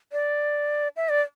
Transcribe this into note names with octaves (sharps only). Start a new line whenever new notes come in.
D5
E5
D5